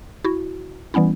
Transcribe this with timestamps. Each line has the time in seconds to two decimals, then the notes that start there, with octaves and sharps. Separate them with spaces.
0.25 E4 F#4
0.94 E3 G3 B3 C#4 E4